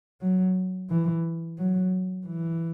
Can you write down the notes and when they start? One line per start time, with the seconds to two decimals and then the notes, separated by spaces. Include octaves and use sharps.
0.21 F#3
0.90 E3
1.58 F#3
2.27 E3